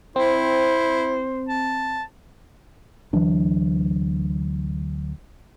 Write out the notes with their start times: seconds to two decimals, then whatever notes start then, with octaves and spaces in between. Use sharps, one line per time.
0.16 C4 E4 C5
1.48 A5
3.13 D2 E3 F#3 D4